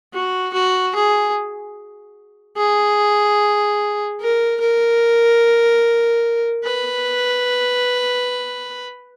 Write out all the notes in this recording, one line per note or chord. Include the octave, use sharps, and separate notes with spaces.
F#4
F#4
G#4
G#4
A#4
A#4
B4